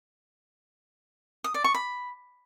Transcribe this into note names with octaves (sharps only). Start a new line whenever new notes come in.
D#6
D5
C#6
B5